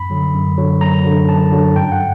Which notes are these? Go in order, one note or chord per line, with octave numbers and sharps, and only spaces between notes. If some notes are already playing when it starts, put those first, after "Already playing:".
Already playing: F#2 B5
D3 F#3
F#2
D3 F#3
F#2 A#5
D3 F#3
F#2 A5
D3 F#3
G2 G5
F#5